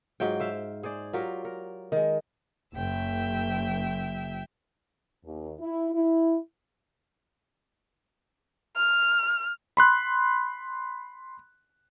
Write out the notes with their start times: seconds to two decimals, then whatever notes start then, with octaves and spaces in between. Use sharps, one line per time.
0.20 G#2 F#3 F4 G5
0.40 C5 E5 F5
0.83 G#4 C5 D5
1.13 F#3 F4 G4 A#4
1.45 A#4
1.92 D#3 G#3
2.75 F#1 E5 G5
5.24 D#2
5.59 E4
5.93 E4
8.77 F6
9.77 B5 C6 F#6